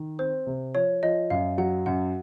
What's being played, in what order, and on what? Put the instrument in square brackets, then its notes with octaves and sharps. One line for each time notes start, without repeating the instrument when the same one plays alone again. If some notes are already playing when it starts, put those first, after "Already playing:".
Already playing: [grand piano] D#3
[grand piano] C4 [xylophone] C5
[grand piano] C3
[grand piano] F3 [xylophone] C#5
[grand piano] F3 [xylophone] D#5
[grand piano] F#2 [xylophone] F5
[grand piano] F#3 [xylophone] F#5
[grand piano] F#2 [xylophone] F#5